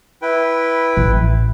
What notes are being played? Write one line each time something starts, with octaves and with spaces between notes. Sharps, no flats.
E4 B4 G5
A1